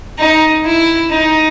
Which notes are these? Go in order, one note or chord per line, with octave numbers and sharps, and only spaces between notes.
D#4
E4
D#4